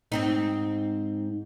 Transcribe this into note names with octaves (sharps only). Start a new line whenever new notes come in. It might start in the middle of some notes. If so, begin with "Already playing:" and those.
G#2 C4 D#4